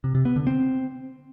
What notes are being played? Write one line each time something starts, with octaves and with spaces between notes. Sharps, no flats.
C3
C3
B3
D3
C4